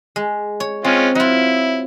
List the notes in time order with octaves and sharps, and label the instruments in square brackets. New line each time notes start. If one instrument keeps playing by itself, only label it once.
[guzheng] G#3
C#5
[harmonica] G#3 C#4 F4 [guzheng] C4
[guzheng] F#3 F4 [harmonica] E4